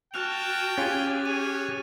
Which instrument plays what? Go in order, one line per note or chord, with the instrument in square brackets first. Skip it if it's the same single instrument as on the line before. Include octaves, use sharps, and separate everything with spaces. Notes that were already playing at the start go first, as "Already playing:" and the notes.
[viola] F#4 A5 [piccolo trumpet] G5 [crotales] F6 F#6 F7
[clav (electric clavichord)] C#4 F4 [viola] G4 G#4 [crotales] A6
[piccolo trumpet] C#5 [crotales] D#7